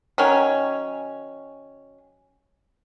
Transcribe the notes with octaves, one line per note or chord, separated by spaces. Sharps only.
D#3 F#3 C#4